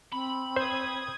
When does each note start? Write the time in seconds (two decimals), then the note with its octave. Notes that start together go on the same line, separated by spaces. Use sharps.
0.12 C4 B5
0.56 C5 D#6 G#6